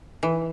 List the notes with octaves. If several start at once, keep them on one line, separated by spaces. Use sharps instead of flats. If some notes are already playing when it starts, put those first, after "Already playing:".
E3